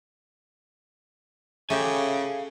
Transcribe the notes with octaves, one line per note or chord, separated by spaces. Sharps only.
C#3 A3 G4 F5 G#5